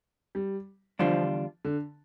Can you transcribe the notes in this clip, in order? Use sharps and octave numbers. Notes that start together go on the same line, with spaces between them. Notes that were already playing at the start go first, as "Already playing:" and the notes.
G3
E2 D3 F3 G3 D4 F4
D3